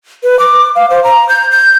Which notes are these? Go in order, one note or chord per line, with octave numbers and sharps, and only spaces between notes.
B4
D6
F5
C5
A#5
G6
G6